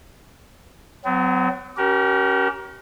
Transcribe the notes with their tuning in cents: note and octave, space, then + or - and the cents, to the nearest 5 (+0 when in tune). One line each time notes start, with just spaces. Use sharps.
F#3 +0 C4 -45
C#4 +0 G4 -35 A#4 +25